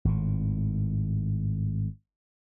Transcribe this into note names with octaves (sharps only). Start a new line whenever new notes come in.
G#1 A2